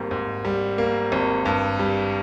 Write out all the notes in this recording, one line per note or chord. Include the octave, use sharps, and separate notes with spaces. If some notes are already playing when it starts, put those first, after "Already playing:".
Already playing: G#1 G#2 G3 A#3
G#2
G3
A#3
G#1
G2
G3